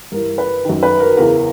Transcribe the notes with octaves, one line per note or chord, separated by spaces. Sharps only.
G2 E3 A#4
B4
F#2 D#3
B4
A#4
E2 C#3 E3 A#4